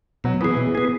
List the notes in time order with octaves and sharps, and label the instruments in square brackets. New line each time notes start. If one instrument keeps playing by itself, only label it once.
[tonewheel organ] B2 [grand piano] F#3
[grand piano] E3 [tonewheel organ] B3 G#4
[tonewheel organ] B2
B3 G#4